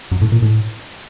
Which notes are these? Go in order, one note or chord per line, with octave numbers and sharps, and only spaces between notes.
F#2
A2
A#2
A2